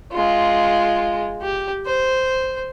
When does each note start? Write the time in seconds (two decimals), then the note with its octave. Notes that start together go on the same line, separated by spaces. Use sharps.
0.12 G#3 F4
1.42 G4
1.86 C5